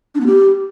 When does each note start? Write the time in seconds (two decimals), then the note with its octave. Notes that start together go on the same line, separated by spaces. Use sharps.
0.15 D4
0.21 B3
0.26 G4